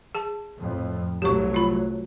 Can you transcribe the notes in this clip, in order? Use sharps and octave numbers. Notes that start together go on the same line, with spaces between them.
G#4 A5
F2 A2
C2 F#3 A3 G4 C#6
F4 B5